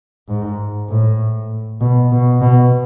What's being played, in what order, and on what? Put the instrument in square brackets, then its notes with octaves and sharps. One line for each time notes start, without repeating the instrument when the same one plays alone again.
[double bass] G#2
A2
B2
B2
B2